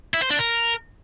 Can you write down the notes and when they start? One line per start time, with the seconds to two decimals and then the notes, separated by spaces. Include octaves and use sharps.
0.14 E4
0.22 C5
0.31 D4
0.39 A#4